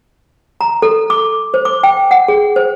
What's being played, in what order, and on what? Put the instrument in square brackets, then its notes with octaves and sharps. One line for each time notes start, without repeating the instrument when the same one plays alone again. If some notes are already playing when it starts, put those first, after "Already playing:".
[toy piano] A#5
A4
D6
C5
D6
G5
F#5
G#4
C5